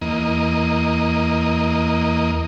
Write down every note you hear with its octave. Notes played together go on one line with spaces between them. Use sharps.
E2 A#3 D#5